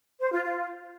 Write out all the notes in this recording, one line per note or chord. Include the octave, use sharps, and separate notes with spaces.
C5
F4
F4